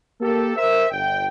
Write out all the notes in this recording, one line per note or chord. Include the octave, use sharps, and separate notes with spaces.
A#3 G4 A4
A#4 C5 E5
G1 G5